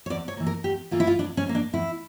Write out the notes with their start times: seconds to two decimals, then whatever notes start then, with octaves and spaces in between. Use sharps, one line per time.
0.06 C#5
0.10 E2 D5
0.28 C#5
0.37 E3 A#3
0.47 A#4
0.64 E2 G4
0.91 E3 A#3 F4
1.00 E4
1.07 F4
1.19 E2 D4
1.37 C#4
1.46 E3 A#3
1.55 D4
1.73 E2 E4